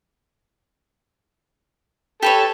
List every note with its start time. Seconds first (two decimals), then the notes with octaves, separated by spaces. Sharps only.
2.22 G4 A4 B4 C#5